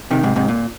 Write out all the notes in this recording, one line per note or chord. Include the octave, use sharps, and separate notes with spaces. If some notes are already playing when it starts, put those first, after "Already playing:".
C3 D#3
G#2 C3
G#2 C3
A#2